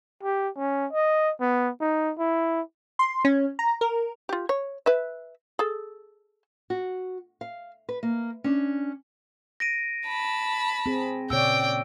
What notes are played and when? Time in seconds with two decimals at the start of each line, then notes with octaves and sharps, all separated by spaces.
0.23 G4
0.57 C#4
0.93 D#5
1.41 B3
1.81 D#4
2.19 E4
2.99 C6
3.25 C#4
3.59 A#5
3.81 A#4
4.29 F4 G4
4.49 C#5
4.86 B4 E5
5.59 G#4 A4
6.70 F#4
7.41 F5
7.89 B4
8.03 A#3
8.44 C#4 D4
9.60 A#6 D7 D#7
10.08 A5 B5
10.86 C4 G#4
11.30 A#2 C#3 C#5 D5 G5 E6 D7